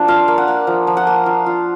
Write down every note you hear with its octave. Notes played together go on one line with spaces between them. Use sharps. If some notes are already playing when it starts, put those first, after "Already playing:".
Already playing: F3 A#3 D4
F4 F5
A#3
F#5
A#3
F3
F3
F#5
A#3
F4
F4